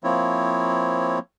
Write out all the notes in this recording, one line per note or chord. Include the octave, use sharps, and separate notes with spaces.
F3 A#3 C4 E4 C#5